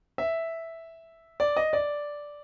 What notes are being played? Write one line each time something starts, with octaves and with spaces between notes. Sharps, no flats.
E5
D5
D#5
D5